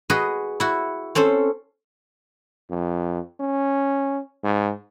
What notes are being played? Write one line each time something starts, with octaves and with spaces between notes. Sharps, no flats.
F#4 G#4 B4 D#5
E4 F#4
C4 C#4 A4 C5
F2
C#4
G#2